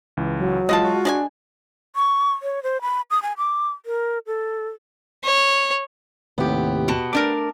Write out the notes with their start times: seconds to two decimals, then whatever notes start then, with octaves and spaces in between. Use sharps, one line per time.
0.17 C#2 E3
0.38 F#3
0.69 E3 G#3 F4 D#5 F#5 A5
0.83 F#4
1.05 G#3 D4 D5 G#5
1.96 C#6
2.43 C#5
2.63 C5
2.82 B5
3.11 D#6
3.23 G#5
3.38 D6
3.86 A#4
4.27 A4
5.24 C#5
6.38 D#2 A2 C3 B3 G4
6.88 B2 F#4 A5
7.13 A3 D4 A#4 D6